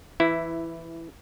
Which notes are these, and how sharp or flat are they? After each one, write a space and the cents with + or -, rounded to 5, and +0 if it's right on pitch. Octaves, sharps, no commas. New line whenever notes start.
E3 +10 E4 +0